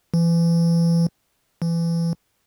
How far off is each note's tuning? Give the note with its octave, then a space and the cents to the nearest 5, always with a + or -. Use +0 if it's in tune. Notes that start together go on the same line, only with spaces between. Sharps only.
E3 +35
E3 +30